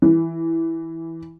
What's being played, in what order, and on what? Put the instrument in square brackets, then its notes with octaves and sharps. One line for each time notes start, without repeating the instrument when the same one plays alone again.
[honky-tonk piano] E3